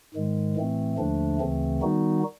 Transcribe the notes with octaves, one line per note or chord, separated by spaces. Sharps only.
G#2 D#3 G#3
A2 E3 A3 C4
D#2 D3 F3 A3 D4
D2 C#3 E3 A3 C4
D#3 G3 B3 D#4 F#4